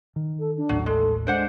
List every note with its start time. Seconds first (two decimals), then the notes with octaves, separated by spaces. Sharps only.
0.16 D#3
0.39 A4
0.57 D4
0.69 A1 D#2 A2 F#3
0.86 G#3 A4
1.27 G#3 D4 C5 F#5